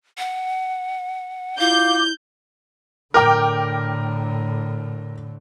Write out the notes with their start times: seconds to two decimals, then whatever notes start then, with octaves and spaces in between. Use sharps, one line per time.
0.18 F#5
1.60 E4 F4 F5 D6 G6
3.14 A2 D3 A#4 G5 D6 F6